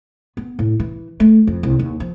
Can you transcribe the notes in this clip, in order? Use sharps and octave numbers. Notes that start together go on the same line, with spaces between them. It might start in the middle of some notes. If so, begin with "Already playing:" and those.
B3
A2
E3
A3
F2
C2
D#2
F3